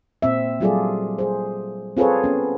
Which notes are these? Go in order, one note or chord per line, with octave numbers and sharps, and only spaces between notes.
A#2 C4 E5
F#3 G3 F4 G#4 A4 D5
G#4 C5
C4 F4 G#4 A4 B4 C#5
B3 C#4